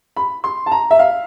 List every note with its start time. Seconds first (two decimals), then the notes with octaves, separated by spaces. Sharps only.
0.17 B5
0.44 C6
0.66 A5
0.72 A#5
0.91 E5
0.99 F5